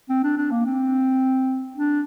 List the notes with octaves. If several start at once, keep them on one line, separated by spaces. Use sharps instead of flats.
C4
D4
D4
A#3
C4
D4